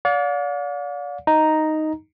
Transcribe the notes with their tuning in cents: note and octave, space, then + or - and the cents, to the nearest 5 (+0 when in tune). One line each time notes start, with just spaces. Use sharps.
D5 -35 F5 +40
D#4 +0 A#5 +0